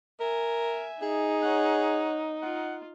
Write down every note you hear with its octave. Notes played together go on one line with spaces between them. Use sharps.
A#4 E5 G#5
D#4 G#4
C#5 F#5
F4 F#5